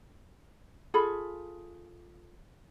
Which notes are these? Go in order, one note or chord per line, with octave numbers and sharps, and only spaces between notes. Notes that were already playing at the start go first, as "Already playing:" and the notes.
F4 G#4 A4 B5